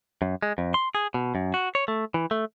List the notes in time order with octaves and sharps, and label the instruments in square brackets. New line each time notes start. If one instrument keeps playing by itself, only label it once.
[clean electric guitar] F#2
G#3
F2
C6
G#4
B2
F#2
F#4
C#5
A3
E3
A3